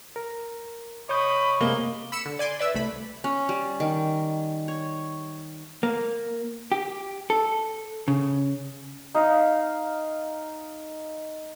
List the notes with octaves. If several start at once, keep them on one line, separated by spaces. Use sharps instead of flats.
A#4
C#5 D#5 B5 C#6 D#6 G6
C3 G#3 A#3 G7
B5 E6 C#7 E7
D3
D5 G#5 C6 D6
B4 D5 E5 E6
C2 A3 B5
C#4
G3
D#3
C#5
A#3
G4
A4
C#3
D#4 F5